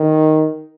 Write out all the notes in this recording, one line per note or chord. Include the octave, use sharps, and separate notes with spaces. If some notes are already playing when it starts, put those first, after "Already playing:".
Already playing: D#3